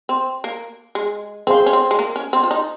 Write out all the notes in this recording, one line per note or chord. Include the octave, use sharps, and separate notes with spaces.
C4
A#3
G#3
C4 G#4 C5 F5 C6
C#4
C4
G#3
A#3
C#4
C4
F4
D#4